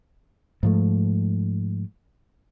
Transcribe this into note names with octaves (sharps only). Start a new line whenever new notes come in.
G#2 F3 A3